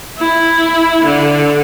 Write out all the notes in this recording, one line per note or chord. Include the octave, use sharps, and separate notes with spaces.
E4
D3